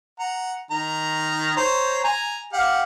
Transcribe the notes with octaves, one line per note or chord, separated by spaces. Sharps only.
F#5 A#5
D#3 A#5
C5 C#5 A#5
G#5 A#5
G4 F5 F#5